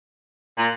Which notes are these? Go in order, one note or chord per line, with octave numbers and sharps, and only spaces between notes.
A#2